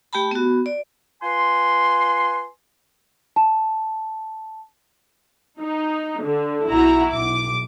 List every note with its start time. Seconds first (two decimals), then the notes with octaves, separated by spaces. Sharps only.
0.13 A3 G4 G5 A5 B5
0.31 B3 F#4
0.66 D5
1.23 F4 B4 G#5 C6
3.36 A5
5.60 D#4
6.22 D3
6.69 B1 E4 F#4 A#5
7.12 B1 D6